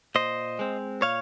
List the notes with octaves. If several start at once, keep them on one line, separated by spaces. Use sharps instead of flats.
A#2 C5 D#5
G#3 C4
A#2 C#5 F5